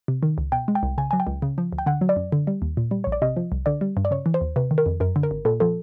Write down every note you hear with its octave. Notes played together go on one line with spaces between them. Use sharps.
C3
D#3
C#2
B2 G5
G#3
G5
C2
C#3 G#5
F#3 G#5
G5
C#2
C#3
F3
D2
G5
D3 F#5
F#3
D5
F#2
D3
G3
D#2
A#2
G3
A#1 C#5
D5
C3 D#5
F3
C2
D3 D5
G3
G2
D5
C#3 C#5
E3
C5
D#2
C3 B4
D#3
A#4
F2
F#2 A#4
D3
A#4
G#1
A#2 A4
F3 A4